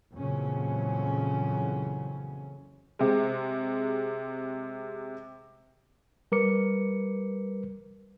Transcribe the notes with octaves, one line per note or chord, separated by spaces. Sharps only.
F2 A#2 C#3 E3 F#3 C#4
C3 G#3
G3 A#4 B4 D6 C#7